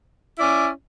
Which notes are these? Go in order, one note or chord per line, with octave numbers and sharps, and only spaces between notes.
C#4 E4 D5